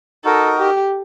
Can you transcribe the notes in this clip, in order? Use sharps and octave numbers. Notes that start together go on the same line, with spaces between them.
D#4 F#4 A4 A#4 D#5
G4